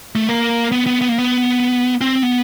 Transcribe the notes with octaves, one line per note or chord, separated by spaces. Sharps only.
A3
A#3
B3
B3
B3
A#3
B3
C4
B3